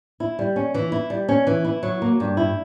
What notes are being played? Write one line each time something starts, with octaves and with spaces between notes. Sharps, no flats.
E4
G3
C#4
E3
E4
G3
C#4
E3
E4
F#3
A#3
G2
E4